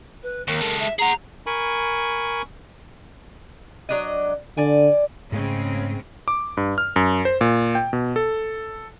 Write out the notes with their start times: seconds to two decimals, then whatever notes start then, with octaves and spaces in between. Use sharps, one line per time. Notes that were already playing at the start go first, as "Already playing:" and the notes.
0.23 B4
0.48 D#2 A#4
0.61 G#3 A4
0.79 E5
0.99 G#4 F#5 A#5
1.46 A#4 G#5 B5 C#6
3.89 F#3 D4 D#5
4.57 D3 D5 G#5
5.32 G#2 C#3 G#3 A3 C4 C#4
6.28 D6
6.57 G2
6.78 F6
6.96 F#2
7.25 C5
7.41 A#2
7.75 G5
7.93 B2
8.16 A4